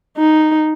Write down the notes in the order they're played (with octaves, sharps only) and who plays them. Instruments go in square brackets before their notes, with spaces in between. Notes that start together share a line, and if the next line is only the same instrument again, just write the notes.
[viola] D#4